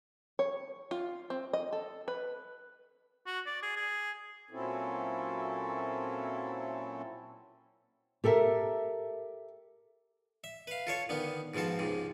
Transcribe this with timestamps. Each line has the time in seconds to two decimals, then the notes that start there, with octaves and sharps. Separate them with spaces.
0.39 C#5
0.91 F4
1.30 C4
1.53 D#5
1.73 A4
2.08 B4
3.26 F#4
3.46 D5
3.63 G#4
3.76 G#4
4.51 A#2 F#3 C4 C#4 E4 A4
8.24 G4 A4 A#4 E5
10.44 E5
10.67 B4 F5
10.87 F4 A4 C#5
11.09 D3 D#3 B3
11.54 G#2 B2 F3 C4 A4
11.79 C#2 G#2 C3